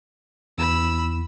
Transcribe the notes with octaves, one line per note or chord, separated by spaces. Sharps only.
E2 B5 E6